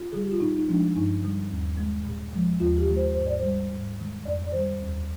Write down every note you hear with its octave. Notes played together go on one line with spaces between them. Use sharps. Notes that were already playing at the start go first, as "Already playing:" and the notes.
Already playing: F4
D3 G3 G#4
G4
F4
A#2 D#4
D#4
F3 G#3 D4
G2 D#4
D3 G3
D#2
D#3 G#3
A#2
F3 G#3
D#2 F4
G4
D#3 G#3
C5
G#2 C5
D5
G3 C5
G#2
D#3 G#3
F2 D5
D5
D#3 G3 C5
D#2